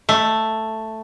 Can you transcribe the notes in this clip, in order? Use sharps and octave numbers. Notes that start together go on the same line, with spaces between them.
A3